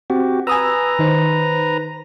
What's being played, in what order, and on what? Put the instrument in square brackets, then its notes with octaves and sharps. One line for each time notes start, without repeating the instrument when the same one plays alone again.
[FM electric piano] C4 [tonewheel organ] F#4 G4
[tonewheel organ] B4 A#5 [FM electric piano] G#5 D#6 E6
[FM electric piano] D#3 D#4 C5